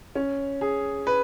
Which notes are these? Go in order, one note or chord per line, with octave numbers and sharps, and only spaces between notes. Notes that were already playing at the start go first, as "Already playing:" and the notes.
C#4
G#4
B4